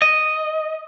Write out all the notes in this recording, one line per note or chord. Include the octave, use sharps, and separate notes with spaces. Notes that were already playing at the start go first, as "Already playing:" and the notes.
D#5